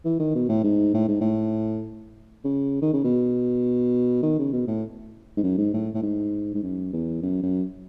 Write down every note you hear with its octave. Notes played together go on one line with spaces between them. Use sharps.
E3
D#3
B2
A2
G#2
A2
G#2
A2
C#3
D#3
C#3
B2
D#3
C#3
B2
A2
G#2
F#2
G#2
A2
A2
G#2
G#2
F#2
E2
F#2
F#2